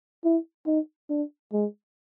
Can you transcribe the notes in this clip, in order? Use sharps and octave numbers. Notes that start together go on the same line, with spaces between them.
E4
D#4
D4
G#3